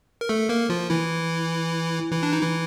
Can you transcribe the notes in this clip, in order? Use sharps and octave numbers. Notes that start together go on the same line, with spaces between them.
A#4
A3 A4
A#3 A#4
F3 F4
E3 E4
E3 E4
D4
D#4
E3 E4